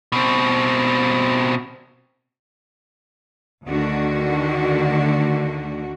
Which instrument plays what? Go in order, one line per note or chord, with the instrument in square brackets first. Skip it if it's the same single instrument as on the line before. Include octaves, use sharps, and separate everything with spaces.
[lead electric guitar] B2 C4
[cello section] D2 D3 D#3 F#4